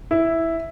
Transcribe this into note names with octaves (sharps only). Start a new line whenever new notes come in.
E4